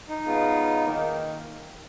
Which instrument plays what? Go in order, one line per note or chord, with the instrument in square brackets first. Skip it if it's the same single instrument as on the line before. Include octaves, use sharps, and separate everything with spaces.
[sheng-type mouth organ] D#4
[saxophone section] C#3 G#3 B3 F4
D#3 A#3